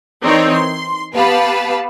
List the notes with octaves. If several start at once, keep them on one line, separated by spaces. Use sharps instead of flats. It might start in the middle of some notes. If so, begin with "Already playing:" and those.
E3 C4 D#4 A#4 C#5 D5
C6
B3 G4 B4 F5 A5 B5